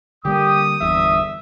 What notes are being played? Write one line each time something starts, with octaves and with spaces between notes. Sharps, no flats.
D3 G3 A#3 G4 D#6
G1 E2 G2 E5